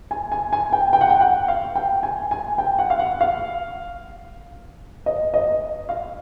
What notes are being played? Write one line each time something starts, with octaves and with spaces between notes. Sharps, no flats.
G#5
G#5
G#5
G5
G5
F#5
G5
F#5
F5
G5
G#5
G#5
G5
F#5
F5
F#5
F5
D#5
D#5
F5